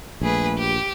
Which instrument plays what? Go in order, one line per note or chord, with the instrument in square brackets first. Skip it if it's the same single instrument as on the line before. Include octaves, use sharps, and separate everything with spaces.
[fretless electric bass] A#1 [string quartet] A3 G#4 B4
[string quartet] G4